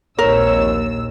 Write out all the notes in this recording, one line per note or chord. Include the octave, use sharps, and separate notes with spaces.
A#1 D#2 G#2 C3 A#4 C#5 E6